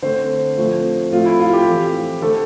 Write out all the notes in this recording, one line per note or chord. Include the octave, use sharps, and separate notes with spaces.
D3 A3 C4 C5
A2 F3 A3 C4
A2 F3 A3 C4 F4
E4
F4
G4
E3 A3 C4
D3 A3 C4 A4